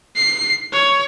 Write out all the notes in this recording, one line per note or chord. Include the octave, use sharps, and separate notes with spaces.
C7
C#5